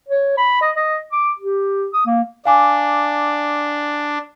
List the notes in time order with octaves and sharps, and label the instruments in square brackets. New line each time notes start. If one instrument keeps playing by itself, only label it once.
[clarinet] C#5
B5
D#5
D#5
D6
G4
D#6
A#3
[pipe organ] D4 [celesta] F5 G#5 D6